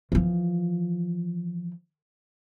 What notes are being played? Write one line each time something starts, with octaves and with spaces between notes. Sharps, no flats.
E3 F3